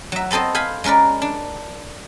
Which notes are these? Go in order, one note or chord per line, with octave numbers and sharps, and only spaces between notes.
F#3 E5
B3 C4 A4 C5 D#5
C5 F5 G#5 B5
G#3 C#4 A#4 B4 D5
D4